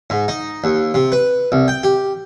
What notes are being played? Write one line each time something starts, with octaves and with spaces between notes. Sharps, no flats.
G#2
D#4
D#2
C3
B4
C2
G5
G4